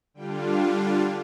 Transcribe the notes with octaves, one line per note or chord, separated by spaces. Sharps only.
D3 G3 D4 F4 G5
F5